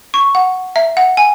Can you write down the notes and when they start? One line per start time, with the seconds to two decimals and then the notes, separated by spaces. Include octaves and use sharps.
0.14 C#6
0.35 F#5
0.76 E5
0.97 F#5
1.17 G#5